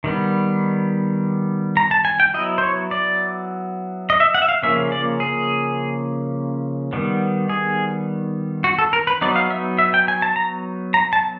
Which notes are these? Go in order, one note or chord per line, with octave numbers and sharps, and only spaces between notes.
D#3 G3 B3
A#5
A5
G#5
G5
F#3 B3 E4 D#5
C5
C#5
D5
D#5
E5
F#5
E5
F5
C#3 F3 A#3 C#4 E5
D5
G#4
D#3 G3 B3
G#4
F#4
A4
A#4
B4
F#3 B3 D#4 D5
F5
E5
E5
G5
G#5
A5
A#5
A#5
A5